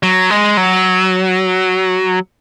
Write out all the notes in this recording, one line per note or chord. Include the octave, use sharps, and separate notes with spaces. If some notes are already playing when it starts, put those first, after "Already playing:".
F#3
G#3
F#3